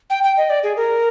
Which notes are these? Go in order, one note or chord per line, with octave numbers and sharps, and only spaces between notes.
G5
G5
D#5
D5
G#4
A#4